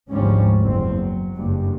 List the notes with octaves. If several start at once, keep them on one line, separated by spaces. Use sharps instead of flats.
G#1 D2 G#2 F3 G3 C#4
F#1 E2 C4
F#3
F#1 G2